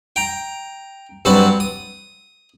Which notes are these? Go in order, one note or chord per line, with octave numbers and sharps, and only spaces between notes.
G5 A#5
G2 F#3 C4 F#4 B4 A5
D#6